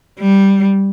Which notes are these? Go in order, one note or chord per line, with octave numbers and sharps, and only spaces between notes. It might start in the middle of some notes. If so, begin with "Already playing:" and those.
G3